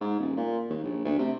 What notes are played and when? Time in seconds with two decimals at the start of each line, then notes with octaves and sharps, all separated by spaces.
0.01 G#2
0.20 D#1
0.37 A#2
0.70 D#2
0.84 A#1
1.05 D2
1.19 C3